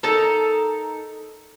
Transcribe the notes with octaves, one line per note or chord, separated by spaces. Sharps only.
D#4 A4 A#4 A#5